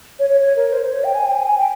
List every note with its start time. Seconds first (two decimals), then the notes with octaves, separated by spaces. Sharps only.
0.19 C#5
0.30 C#5
0.41 C#5
0.56 A#4
0.73 C5
0.83 C5
0.93 C#5
1.04 G5
1.15 G#5
1.26 G5
1.36 G#5
1.47 G#5
1.58 G5